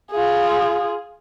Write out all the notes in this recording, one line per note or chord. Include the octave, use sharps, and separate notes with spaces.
F4 G#4